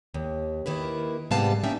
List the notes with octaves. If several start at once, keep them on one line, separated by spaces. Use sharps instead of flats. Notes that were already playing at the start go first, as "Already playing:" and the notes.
D#2
D#3 A#3 E4 B4
G#2 C3 G3 B3 F5 A5
A#3 C#4 D#4 E5 G5